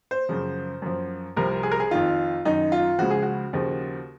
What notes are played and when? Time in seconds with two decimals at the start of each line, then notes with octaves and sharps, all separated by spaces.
0.11 C5
0.29 F#2 C#3 F3
0.82 F#2 F3
1.36 C2 C3 F3 A#4
1.63 G#4
1.72 A#4
1.80 G#4
1.91 F2 D#3 F4
2.45 F#2 D#3 D#4
2.72 F4
2.98 C#2 C#3 F3 F#4
3.10 G#4
3.22 F#4
3.53 D#2 C#3 F3